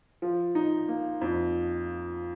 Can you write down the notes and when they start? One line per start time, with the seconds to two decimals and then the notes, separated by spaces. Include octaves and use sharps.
0.22 F3
0.55 D#4
0.88 A#3
1.21 F2